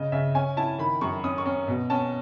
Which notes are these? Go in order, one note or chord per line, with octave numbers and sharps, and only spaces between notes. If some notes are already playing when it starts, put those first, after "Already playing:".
Already playing: C#3 D#5
C#3 E5
C#4 G#5
E4 A5
D#3 B5
F#2 C#6
C#4 D#6
C#6
C#4
B2
C#4 A5